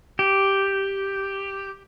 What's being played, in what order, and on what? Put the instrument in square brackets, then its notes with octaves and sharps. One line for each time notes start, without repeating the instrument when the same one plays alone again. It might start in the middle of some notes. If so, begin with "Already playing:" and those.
[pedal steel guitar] G4